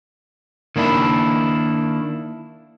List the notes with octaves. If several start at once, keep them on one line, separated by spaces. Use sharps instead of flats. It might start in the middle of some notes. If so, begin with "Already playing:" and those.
D#3 A#3 D4 E4